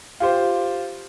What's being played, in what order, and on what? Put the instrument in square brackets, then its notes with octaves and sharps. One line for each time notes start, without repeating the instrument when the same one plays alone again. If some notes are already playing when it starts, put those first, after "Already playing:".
[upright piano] F4 G4 C5